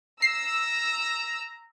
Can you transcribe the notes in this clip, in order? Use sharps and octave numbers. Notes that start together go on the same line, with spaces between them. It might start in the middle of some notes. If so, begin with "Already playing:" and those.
A#5 E6 C7